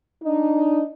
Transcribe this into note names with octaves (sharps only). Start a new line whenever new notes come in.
D4 D#4